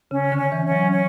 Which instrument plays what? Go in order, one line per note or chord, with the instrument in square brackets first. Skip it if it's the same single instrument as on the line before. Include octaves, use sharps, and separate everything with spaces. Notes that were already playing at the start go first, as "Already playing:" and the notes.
[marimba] C#3 [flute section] C#4
[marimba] D3
[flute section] C#4
[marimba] E3
[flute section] C#4
[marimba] F#3
[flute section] C#4